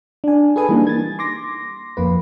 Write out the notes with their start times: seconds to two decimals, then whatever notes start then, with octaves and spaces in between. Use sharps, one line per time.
0.24 D4 G#5
0.56 G#4 A4 B4 G#5 D#6
0.69 E3 G3 A#3 D4 D#4
0.87 G#6 A6
1.19 C6 D6 A#6
1.97 F2 A#3 B4